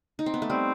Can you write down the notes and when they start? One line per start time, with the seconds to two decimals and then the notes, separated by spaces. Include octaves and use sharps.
0.19 D#4
0.26 C4
0.34 B3
0.42 A3
0.50 G3 C4